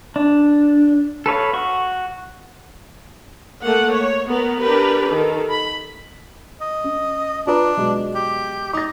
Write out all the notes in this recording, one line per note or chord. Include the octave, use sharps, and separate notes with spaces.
D4
A4 B4 C#5 F5
F#4 C#6
A3 A#3 F#5
C#5
B3 A#4
D4 G4 A#4 B4
D#3 A4
B5
D#5
C#4
D4 F4 B4 A#5
B2 F#3 G#3
G4
D#4 D6 A#6